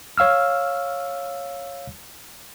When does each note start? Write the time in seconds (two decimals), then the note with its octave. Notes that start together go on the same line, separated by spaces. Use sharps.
0.18 C#5 F5 E6 F6